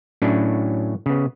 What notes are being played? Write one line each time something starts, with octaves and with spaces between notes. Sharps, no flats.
A2 F#3 C#4 D4 E4
C#3 B3